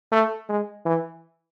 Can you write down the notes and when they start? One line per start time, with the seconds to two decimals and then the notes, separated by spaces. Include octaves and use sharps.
0.12 A3
0.49 G#3
0.86 E3